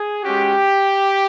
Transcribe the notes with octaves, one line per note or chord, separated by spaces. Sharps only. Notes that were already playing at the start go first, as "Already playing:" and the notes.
Already playing: G#4
G#3 C#4 F#4 G4